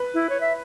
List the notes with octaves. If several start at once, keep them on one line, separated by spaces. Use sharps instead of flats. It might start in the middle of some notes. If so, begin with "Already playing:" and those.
Already playing: B4
E4
C#5
E5